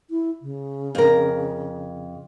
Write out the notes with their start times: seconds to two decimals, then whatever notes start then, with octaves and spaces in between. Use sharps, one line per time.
0.10 E4
0.42 C#3
0.95 F2 A#4